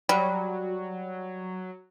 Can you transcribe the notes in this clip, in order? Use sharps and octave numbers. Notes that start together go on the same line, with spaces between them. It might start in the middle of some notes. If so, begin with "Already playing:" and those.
F#3 G3